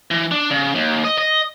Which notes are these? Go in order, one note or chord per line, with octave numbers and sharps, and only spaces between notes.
E3
D4
C#3
D#2
D#5
D#5